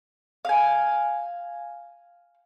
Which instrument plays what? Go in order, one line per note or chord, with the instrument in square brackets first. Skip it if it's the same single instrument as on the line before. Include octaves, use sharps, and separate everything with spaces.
[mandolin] F5 G#5